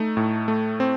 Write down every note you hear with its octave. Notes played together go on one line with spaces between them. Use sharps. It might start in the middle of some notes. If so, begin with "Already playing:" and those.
Already playing: A3 D#4
A2
A3
C4